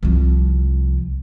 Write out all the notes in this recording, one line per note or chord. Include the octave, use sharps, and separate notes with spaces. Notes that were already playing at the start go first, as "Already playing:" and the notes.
C2 F3